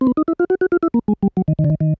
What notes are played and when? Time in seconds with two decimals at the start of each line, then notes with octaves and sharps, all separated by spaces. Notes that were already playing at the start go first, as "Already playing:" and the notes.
0.01 C4
0.07 B3
0.17 D#4
0.28 E4
0.39 F4
0.50 F#4
0.61 F#4
0.72 F4
0.83 E4
0.94 A#3
1.08 G#3
1.23 G3
1.37 F#3
1.48 D#3
1.59 D#3
1.64 D3
1.70 D#3
1.80 D#3